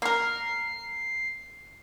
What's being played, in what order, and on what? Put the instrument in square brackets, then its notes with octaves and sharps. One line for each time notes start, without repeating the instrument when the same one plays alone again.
[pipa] A#3 A#4 [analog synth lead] C7